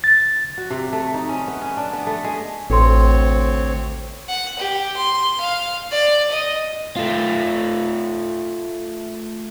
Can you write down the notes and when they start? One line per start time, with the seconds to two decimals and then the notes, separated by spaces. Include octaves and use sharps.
0.04 A6
0.58 F#4
0.70 C3
0.93 A3
1.14 D#4
1.29 C#4
1.48 B3
1.62 C#4
1.77 D4
1.93 B3
2.07 A3
2.24 G#3
2.70 A1 D2 C4 A4 B4 C#5 C6
4.29 F#5
4.59 G4
4.96 C6
5.40 F5
5.91 D5
6.30 D#5
6.97 A3 F4